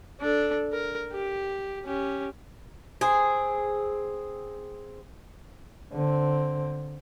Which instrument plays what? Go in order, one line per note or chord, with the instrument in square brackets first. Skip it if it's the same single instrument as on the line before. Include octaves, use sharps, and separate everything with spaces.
[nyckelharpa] D4 A4
A#4
G4
C#4 G4
[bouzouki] C4 G#4
[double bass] D3 C4